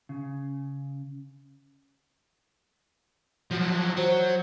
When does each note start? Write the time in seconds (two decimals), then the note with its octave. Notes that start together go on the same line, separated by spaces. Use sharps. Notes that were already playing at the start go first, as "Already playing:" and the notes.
0.09 C#3
3.51 F3 F#3
3.97 F#3 F#4 C5